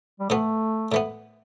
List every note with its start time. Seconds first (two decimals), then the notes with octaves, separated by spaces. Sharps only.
0.20 G3
0.29 A2 E3 A3 B3
0.92 A2 E3 B3